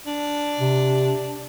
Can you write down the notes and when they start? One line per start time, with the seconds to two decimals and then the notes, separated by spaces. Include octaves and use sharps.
0.06 D4
0.59 C3